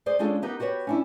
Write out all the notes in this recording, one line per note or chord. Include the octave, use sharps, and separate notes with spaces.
G#4 C5 D5 D#5
G#3 C#4 D4 F4 G#4 A4
B3 D#4 G4 A#4
F#4 G4 B4 C#5 G5
C#4 D4 E4